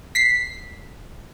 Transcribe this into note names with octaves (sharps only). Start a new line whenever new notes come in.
B6 C7